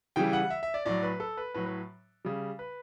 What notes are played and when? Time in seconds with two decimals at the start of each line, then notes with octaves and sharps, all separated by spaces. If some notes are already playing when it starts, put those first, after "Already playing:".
0.16 C#3 E3 G3 G5
0.33 F#5
0.50 E5
0.63 E5
0.74 D5
0.85 A2 F#3 D5
1.03 B4
1.20 A4
1.37 B4
1.54 A2 F#3 B4
1.66 B4
2.25 C#3 G3
2.59 B4